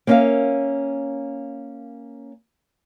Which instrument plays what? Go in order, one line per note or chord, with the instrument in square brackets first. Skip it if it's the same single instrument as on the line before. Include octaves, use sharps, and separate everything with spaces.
[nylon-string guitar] A#3 B3 C#4 A#4 E5 F5